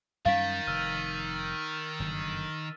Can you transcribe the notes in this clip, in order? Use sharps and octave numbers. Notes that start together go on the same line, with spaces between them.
F#2 D#3 G3 C#4 F5 A6 B6
F1 E6 F6 D#7
F#1 G2 D3